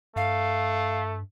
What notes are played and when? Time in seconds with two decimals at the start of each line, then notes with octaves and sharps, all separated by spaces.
0.16 G2 A3 F5